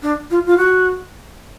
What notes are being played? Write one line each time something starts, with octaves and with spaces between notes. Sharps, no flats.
D4
F4
F4
F#4